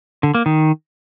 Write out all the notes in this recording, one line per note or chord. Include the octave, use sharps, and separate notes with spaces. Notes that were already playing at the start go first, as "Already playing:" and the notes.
D3
A#3
D#3